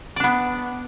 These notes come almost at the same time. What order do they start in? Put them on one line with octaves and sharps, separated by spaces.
D5 D4 B3